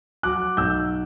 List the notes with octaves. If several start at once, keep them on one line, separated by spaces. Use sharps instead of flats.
F#3 D6 F#6
B1 E6 G6